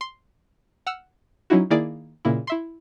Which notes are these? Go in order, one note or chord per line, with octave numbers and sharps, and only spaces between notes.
C6
F#5 E6 F6
F#3 C#4 D#4 E4 F#4
D#3 A#3 E4 G#4 D5
A#2 C#3 A#3 E4
E4 E5 C6